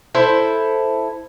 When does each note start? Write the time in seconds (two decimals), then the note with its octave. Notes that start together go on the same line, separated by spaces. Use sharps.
0.15 E4 A4 C5